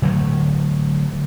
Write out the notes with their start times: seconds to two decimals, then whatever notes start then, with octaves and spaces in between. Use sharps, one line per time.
0.02 D3 F#3 G#3 A3